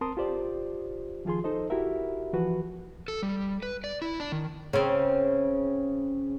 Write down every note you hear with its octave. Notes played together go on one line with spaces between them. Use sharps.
C4 A#4 A5 C6 D#6
F4 G4 C5 D5
D#3 F3 F4 G#4 C6
D#4 A4 C5 D#5
E4 F#4 G4 A#4 E5
E3 F3 F#4 B4
A4
G3
B4
D5
E4
D4
D#3
C#3 C4